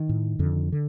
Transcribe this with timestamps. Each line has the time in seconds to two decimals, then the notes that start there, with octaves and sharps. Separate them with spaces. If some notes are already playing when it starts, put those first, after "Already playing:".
Already playing: D#3
0.09 A2
0.39 F2 D3
0.72 D3